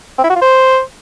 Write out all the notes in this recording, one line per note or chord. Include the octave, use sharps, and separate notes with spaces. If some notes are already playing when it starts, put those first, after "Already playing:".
C4
E4
F#4
F4
C5